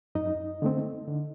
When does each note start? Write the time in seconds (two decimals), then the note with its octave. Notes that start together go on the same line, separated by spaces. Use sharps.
0.15 F#2 D#4 D#5
0.62 D3 A3 C4
1.08 D3